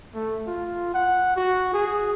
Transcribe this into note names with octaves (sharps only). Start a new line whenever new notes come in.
A3
F4
F#5
F#4
G#4